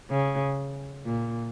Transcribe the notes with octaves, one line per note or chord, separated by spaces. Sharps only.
C#3
A#2